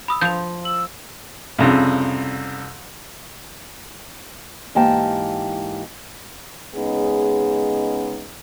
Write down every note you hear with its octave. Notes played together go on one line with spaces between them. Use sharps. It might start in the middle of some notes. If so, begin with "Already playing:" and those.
B5 D#6 E6
F3 G6 F7
E6 F#7
C2 F2 C#3
G#2 E3 A#3 G4 G5 A5
C#3 G#3 B3 C#4 D#4 G#4